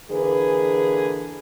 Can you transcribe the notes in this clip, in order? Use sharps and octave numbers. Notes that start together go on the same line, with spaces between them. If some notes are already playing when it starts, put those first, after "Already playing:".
D3 E3 A#3 G#4 B4